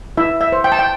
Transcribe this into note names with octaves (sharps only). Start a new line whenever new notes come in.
E4 E5
E5
C5
G5
A5
G5